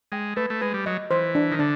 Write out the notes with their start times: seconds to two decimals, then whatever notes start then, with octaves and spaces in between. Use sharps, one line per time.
0.12 G#3 G5
0.36 A3 B4
0.50 A3
0.61 G#3 B4
0.74 G3
0.86 F#3 D#5
1.11 E3 C5
1.35 D4
1.52 D#3
1.59 D3 D4